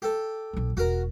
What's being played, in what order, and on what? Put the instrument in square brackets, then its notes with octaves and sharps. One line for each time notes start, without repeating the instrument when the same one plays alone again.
[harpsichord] G4 A4
[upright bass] A#1 F#3
[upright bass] E1 [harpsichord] F#4 A#4